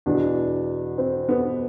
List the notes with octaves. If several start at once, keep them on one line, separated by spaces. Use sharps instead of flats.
E2 B2 D4
C4
B3